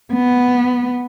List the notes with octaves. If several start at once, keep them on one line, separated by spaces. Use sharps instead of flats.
B3